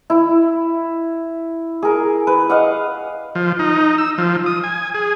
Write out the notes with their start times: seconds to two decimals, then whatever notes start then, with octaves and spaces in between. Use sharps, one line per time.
0.10 E4
1.82 G#4 A#4
2.27 B4
2.50 D#5 F5 F#5
3.35 F3
3.59 D#4
3.98 E6
4.18 F3
4.46 D#6
4.64 G#5
4.94 G#4